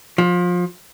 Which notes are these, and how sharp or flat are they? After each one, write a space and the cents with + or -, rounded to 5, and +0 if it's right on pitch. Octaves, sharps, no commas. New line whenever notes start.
F3 +25